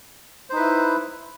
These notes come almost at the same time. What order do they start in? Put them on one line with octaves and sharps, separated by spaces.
C5 D#4 B4 E4